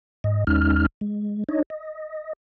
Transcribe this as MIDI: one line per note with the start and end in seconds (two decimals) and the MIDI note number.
0.24 0.44 44
0.24 0.44 75
0.47 0.86 39
0.47 0.86 56
0.47 0.86 61
0.47 0.86 63
0.47 0.86 89
1.01 1.44 56
1.49 1.62 62
1.49 1.62 63
1.49 1.62 73
1.49 1.62 75
1.70 2.33 75